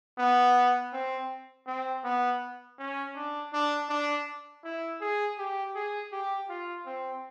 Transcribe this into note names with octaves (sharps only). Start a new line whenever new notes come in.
B3
C4
C4
B3
C#4
D4
D4
D4
E4
G#4
G4
G#4
G4
F4
C4